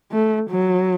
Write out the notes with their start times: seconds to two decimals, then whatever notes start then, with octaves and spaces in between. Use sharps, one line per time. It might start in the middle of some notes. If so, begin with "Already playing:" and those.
0.12 A3
0.50 F#3